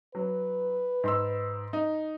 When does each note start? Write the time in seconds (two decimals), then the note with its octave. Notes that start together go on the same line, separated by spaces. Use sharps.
0.15 F#3 B4
1.04 G#2 C6 E6
1.73 D#4